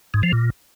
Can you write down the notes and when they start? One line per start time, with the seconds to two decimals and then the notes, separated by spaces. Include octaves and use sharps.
0.14 G#2
0.23 F3
0.33 A#2